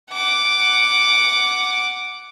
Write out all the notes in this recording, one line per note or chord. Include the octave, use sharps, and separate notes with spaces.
F#5 D6